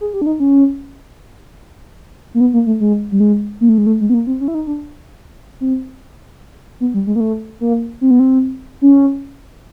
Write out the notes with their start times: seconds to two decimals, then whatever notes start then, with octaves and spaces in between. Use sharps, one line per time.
0.01 G#4
0.14 G4
0.22 D4
0.26 D#4
0.40 C#4
2.34 A#3
2.40 B3
2.53 A#3
2.67 A3
2.80 G#3
3.12 G3
3.20 G#3
3.61 A#3
3.69 A3
3.78 G#3
3.86 A3
4.01 G#3
4.10 B3
4.14 A#3
4.27 C4
4.41 C#4
4.48 E4
4.55 D#4
4.67 D4
5.61 C4
6.80 B3
6.94 G3
7.07 G#3
7.16 A#3
7.20 A3
7.61 A#3
8.01 C4
8.11 B3
8.20 C4
8.82 C#4